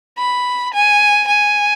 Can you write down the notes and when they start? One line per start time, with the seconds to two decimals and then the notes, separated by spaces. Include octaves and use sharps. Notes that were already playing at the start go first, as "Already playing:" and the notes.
0.18 B5
0.74 G#5
1.28 G#5